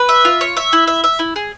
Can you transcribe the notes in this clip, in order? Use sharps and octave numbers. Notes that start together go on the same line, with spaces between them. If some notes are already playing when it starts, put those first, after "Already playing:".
Already playing: B4
E5
F4
C#5
E5
E4
E5
E5
E4
G#4